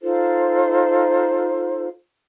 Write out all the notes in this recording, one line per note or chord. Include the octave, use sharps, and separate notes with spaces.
D#4 F4 A4 C5